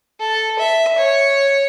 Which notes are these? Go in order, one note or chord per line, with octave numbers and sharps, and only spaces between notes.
A4
E5
C#5